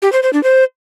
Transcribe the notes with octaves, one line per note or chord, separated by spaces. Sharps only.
G4
C5
C5
D4
C5